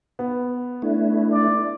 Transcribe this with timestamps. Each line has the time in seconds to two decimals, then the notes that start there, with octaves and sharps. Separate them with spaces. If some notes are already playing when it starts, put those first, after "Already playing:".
0.19 B3
0.82 A3 D4 E4
1.32 D5